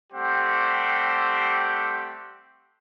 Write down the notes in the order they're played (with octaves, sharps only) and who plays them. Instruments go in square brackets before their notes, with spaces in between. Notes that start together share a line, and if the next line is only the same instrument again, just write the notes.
[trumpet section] G3 A3 C4 G4 C5 F#5